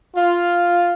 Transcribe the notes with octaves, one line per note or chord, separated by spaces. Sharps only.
F4